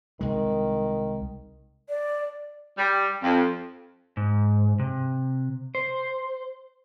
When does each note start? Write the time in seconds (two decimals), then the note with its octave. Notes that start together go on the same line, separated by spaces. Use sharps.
0.21 C2 D#3 G#3
1.89 D5
2.77 G3
3.22 F2
4.17 G#2
4.79 C3
5.75 C5